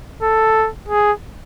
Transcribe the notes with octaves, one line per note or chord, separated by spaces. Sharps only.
A4
G#4